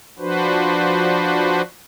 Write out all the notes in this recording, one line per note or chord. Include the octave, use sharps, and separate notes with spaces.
F3 D4 F#4 B4 C5